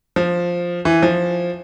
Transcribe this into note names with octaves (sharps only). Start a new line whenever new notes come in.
F3
E3
F3